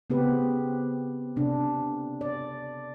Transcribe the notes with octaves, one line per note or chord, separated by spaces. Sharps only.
C#3 B3 C4 G4 B4
C3 D4
D5